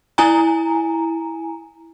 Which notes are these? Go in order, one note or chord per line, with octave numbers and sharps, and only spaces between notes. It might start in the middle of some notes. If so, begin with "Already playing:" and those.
E4 G#5 A#5